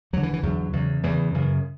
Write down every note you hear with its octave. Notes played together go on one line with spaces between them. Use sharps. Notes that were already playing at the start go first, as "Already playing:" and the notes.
E2 D3 F#3
E3
E3
E2 D3 F#3
E2 C#3
E2 C#3 E3
F#2 C#3